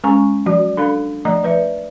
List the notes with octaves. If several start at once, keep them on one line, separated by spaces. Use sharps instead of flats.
G#3 C#4 G#5 A#5 C#6
F3 F#3 F#4 D5
D4 A4 F5 B5
F3 A3 D5 D#5 A#5
F3 B4 D5 E5